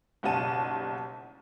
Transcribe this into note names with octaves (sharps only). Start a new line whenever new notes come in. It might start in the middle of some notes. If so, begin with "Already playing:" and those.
F#1 B1 G3 F#5 A5 D#7